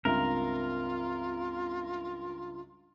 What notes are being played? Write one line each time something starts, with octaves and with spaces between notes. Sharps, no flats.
C#2 G2 C4 F4 A#4 E5